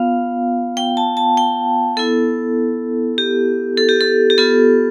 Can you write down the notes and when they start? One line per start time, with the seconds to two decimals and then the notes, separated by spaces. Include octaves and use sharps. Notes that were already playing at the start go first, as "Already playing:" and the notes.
Already playing: B3 F4 F5
0.77 G5
0.97 A5
1.17 A5
1.37 G5
1.97 B3 E4 A4
3.18 G4
3.77 A4
3.89 G4
4.01 A4
4.30 G4
4.38 B3 F4 A4